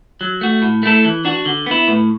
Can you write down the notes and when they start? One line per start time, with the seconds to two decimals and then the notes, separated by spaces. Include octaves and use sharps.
0.21 F#3
0.41 A3 F#4
0.62 A2
0.83 A3 E4 A4
1.05 E3
1.25 D4 F#4
1.45 D3
1.66 B3 E4
1.88 A2